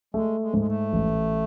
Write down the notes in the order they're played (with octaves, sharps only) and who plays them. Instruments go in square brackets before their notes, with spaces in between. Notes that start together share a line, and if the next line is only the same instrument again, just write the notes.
[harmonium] G#3 [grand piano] A3
[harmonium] G#3
[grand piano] G#2 [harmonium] G#3
[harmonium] A3
[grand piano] A1